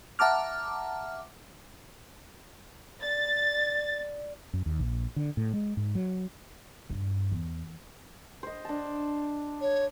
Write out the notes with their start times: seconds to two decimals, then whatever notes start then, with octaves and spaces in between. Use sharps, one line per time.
0.19 E5 F#5 A5 A#5 D6 F6
3.02 D5 A6
4.53 F#2
4.66 D#2
4.79 A#1
5.16 D3
5.37 A2
5.53 G#3
5.77 G#2
5.95 F#3
6.90 G2
7.32 E2
8.43 C5 D#5
8.65 D4 A5
9.61 C#5